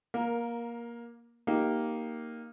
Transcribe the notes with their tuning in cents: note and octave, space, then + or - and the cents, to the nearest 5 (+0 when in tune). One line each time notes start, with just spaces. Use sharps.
A#3 +15 A#4 +0
A#3 +0 D#4 +0 G4 -10